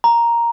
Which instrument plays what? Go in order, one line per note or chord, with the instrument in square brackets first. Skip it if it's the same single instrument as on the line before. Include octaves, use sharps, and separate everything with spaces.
[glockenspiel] A#5